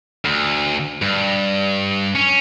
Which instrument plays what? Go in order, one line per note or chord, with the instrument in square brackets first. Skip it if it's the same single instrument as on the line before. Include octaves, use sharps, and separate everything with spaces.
[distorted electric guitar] D2
G2
C#4